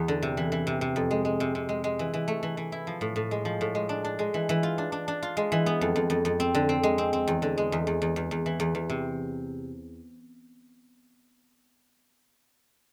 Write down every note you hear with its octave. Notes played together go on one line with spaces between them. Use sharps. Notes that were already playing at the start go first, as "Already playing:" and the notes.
Already playing: E2 B3
D3
C3
E3
E3
C3
C3
F2
G#3
G#3
C3
C3
G#3
G#3
E3
E3
A3
E3
E3
E4
F3
A2
A2
G#3
F3
A2
G#3
D4
D4
G#3
E3
E3
F4
D4
D4
D4
F4
G#3
E3
B3
F2
F2
F2
F2
C4
D3
C4
G#3
C4
C4
E2
D3
G#3
E2
E2
E2
E2
E2
E3
E2
E2
C3